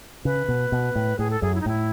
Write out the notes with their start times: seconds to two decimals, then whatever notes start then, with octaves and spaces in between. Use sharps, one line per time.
0.25 C#3 B4
0.48 B2
0.72 B2
0.95 A2
1.19 A2 G#4
1.31 A4
1.42 F#2 G#4
1.55 E4
1.61 D#4
1.66 A2 E4